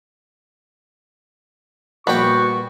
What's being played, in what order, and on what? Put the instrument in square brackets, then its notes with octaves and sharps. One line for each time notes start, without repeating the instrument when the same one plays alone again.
[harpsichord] A#1 G3 D5 [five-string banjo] B3 G5 [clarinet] F#4 [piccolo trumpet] C#6